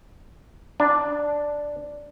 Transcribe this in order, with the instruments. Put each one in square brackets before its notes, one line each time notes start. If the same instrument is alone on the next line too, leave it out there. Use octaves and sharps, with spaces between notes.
[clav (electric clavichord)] D4